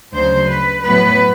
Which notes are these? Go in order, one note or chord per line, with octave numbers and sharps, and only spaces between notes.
D2 C#3 F#3 C5
B4
A2 F#3 B3 B4